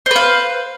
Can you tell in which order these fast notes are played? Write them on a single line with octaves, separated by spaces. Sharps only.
C5 B4 F5